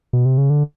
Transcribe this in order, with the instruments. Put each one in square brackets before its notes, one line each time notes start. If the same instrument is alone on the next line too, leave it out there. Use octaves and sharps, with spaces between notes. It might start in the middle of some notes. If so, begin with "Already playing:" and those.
[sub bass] B2
C3
C#3
D3